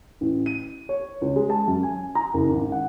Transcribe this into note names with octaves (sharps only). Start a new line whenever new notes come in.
A1
D#7
C#5
C#2
G#3
A5
F#2
G#5
A#5
F#1
G#1
F#5